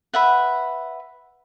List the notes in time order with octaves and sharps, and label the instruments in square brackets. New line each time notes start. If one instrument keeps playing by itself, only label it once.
[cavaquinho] B4 E5 F#5